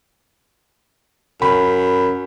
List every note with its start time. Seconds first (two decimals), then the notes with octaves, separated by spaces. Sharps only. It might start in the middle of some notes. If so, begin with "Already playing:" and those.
1.42 F#2 B5